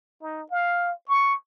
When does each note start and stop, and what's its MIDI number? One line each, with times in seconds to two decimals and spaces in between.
0.22 0.44 63
0.51 0.92 77
1.08 1.34 85